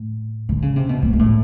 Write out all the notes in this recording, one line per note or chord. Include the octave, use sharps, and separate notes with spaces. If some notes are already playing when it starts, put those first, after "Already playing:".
Already playing: A2
D3
C#3
C3
B2
A#2
A#2
A2